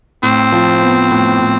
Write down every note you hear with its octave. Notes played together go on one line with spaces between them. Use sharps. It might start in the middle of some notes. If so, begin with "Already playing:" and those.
A2 C4
F3
B3
A2
A2